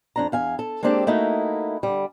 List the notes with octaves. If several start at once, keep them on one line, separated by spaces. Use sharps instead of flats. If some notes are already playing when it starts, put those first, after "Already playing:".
F2 D4 A#5
E2 F5 G#5
A4
G#3 A#3 C4 D4 G4 A4
A3 A#3 D#4 E4 F#4
D3 G3